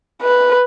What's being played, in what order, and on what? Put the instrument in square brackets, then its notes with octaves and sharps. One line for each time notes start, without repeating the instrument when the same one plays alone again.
[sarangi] B4